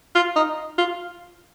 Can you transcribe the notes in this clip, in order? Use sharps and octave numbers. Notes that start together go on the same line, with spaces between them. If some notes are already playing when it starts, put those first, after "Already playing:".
F4
D#4
F4